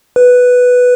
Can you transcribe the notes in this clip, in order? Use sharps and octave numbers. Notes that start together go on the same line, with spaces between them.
B4